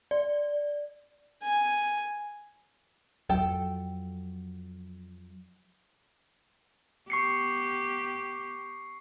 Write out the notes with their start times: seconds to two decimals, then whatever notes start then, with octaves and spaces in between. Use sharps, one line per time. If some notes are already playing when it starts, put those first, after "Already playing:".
0.11 D5
1.43 G#5
3.29 F2 F#3 A4 G5
7.10 B3 G4 C#6 C7 C#7